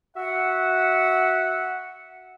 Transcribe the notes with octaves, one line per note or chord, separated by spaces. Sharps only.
F#4 E5 F#5